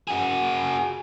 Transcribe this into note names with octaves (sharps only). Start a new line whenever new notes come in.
F#4 G#4